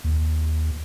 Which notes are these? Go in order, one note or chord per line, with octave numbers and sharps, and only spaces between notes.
D#2